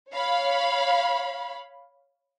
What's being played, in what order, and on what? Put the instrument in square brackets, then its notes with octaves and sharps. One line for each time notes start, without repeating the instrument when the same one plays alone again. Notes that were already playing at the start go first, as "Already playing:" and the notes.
[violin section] C#5 F5 B5